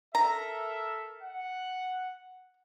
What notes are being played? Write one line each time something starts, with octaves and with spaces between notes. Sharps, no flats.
A4 A#4 E5 A#5
F#5